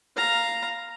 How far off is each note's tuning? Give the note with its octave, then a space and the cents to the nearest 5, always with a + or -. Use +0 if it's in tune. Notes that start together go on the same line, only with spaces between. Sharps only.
F5 -5 A#5 +0